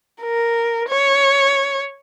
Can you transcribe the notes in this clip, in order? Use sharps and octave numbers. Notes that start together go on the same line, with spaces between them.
A#4
C#5